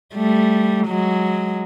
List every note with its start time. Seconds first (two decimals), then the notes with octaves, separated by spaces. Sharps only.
0.15 G3 A3
0.87 F#3 G#3